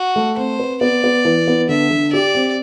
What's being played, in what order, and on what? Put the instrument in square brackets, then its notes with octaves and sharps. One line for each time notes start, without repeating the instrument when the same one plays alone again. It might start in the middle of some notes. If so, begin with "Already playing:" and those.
Already playing: [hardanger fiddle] F#4
[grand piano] A3
[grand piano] C4 [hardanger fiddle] C5
[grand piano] B4
[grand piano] B3 [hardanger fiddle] D5
[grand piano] B3
E3
B3
[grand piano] D3 [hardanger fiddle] E5
[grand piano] D3
[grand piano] G4 [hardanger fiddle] D5
[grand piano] C4